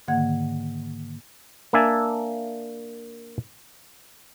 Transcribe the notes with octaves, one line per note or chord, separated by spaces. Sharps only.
G#2 D3 D#3 A#3 F#5 G#6
A#3 D4 E5 G#5 A5